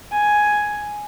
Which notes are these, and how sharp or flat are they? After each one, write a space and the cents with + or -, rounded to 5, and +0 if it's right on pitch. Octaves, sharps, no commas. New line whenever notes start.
G#5 +5